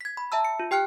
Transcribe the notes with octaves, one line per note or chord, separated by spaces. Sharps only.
G#6 B6
B5
E5 A5 A#5 E6
C#7
F4
G4 G5 F6 F#6 C#7